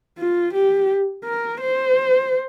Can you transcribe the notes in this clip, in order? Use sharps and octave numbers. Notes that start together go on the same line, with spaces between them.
F4
G4
A#4
C5